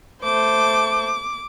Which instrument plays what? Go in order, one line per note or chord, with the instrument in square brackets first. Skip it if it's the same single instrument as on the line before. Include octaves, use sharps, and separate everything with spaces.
[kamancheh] A3 C5 [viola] D6